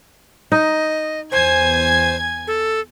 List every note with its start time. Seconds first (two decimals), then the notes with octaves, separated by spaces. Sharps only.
0.52 D#4 D#5
1.32 E2 C5 G#5 G#6
2.47 A4